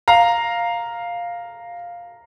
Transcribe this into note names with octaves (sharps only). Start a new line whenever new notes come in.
F5 A#5